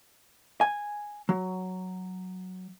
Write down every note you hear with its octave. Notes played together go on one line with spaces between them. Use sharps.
G#5
F#3